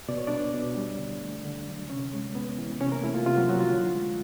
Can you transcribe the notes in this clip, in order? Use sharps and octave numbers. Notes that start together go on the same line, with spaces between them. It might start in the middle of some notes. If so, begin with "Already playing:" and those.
B2 D5
C#5
B3 D4 D5
B2
G3
D3
A3
D3
F#3
C3 C#4 C#5
G#3
B3
E3
C3 C#4 C#5
A#3 A#4
A3 E4
F4
C3 F4
F#3 F#4
F3 F#3 F#4
F4
D3
G#3